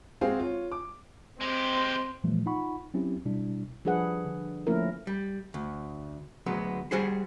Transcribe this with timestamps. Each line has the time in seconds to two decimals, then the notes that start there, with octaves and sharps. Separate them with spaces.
0.21 G#3 C4 F#4 G#4 C5 F5
0.39 F4 C#5
0.72 D6
1.41 G#3 C4 G4
2.24 A#2 E3 F3 G3 A3 B3
2.46 D#4 F4 F#5 B5 C#6
2.94 F#3 C4 C#4 E4 G4
3.25 B2 G3 D4 E4
3.85 F3 G3 D4 G#4 B4 F#5
4.25 D3
4.67 F3 A3 A#3 C#4 E4 A#4
5.07 G3
5.54 D2
6.46 D2 F#3 G#3 B3
6.91 G3 F#4 G#4 C5